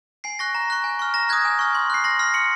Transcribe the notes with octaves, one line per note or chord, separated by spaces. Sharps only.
G#5 C7
C#6 F#6 A#6
A#5
C#6 F#6
G#5
C#6 F6
A#5 A#6
D#6 F#6 G#6
G#5
C#6 F6
C6
F#6 C7
C6 A#6
F6 C7
C6 C#7